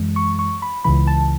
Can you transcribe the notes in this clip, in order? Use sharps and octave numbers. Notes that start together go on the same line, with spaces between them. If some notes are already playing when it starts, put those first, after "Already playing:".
Already playing: F#2 E3 G#3
C#6
C#6
B5
C#2 C#3 E3 B5
A5